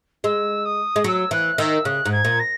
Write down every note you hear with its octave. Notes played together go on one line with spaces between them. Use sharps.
G#3 E6
D#6
G#3
F#3 E6
E3 F#6
D#3 E6
C#3 F#6
G#2
G#6
A#2
A#6